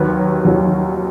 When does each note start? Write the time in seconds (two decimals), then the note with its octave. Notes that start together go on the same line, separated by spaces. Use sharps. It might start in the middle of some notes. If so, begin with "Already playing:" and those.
Already playing: D#2 D#3 F#3 B4 C#5
0.45 D#2 D#3 F#3